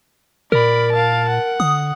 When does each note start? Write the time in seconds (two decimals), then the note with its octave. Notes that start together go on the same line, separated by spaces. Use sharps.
0.52 A#2 A#4 D5 B5
0.92 F5 A5
1.29 F#5
1.60 D3 D#6